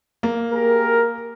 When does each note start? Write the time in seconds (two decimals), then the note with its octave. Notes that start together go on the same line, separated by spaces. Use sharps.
0.23 A#3
0.52 G4 G#4 A#4